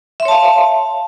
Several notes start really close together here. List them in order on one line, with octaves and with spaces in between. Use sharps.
E5 C6 C#5 A5 F5